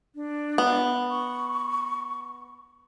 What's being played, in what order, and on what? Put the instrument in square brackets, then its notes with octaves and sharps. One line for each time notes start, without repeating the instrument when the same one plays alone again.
[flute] D4
[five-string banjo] B3
[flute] C#6